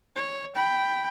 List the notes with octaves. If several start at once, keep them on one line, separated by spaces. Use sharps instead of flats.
C#5
G5 B5